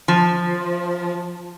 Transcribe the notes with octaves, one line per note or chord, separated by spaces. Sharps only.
F3